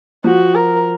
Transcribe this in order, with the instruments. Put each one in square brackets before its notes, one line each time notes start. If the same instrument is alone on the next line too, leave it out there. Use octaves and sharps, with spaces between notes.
[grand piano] F3 [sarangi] F#4
[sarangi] A#4